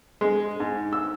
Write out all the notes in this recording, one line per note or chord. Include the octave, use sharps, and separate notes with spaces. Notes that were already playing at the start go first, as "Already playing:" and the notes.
G#3
G#2
E6